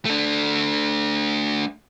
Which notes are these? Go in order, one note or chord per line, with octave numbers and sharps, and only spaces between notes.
A3 D4